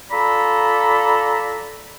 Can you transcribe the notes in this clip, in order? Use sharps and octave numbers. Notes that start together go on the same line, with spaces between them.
F4 A4 D5 A#5 B5